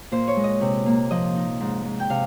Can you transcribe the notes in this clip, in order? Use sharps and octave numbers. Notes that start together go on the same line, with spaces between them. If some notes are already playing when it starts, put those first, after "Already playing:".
A#2 C5
C#5
G#3
D#5
C3
A#3
F3 D#5
D#4
G#2
G#2
G5
C3 F5